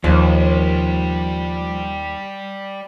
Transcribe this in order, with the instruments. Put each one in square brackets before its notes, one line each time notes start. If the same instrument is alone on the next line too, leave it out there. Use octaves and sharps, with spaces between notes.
[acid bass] D#2 [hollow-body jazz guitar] F3 [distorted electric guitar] G3 C5